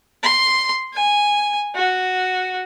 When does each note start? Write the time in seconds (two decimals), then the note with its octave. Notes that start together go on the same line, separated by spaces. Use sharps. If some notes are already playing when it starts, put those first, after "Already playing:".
0.23 C6
0.94 G#5
1.75 F#4